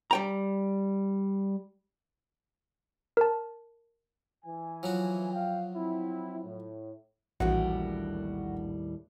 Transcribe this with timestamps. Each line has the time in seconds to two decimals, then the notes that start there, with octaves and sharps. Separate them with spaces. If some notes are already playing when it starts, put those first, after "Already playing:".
0.11 G3 G5 A#5
3.17 A#4 A5
4.44 E3 G#5
4.83 F3 F#3 F#4
5.33 F5 G5
5.75 C4 E4
6.45 A2
7.40 A#1 D#2 A2 E3 G3 F#4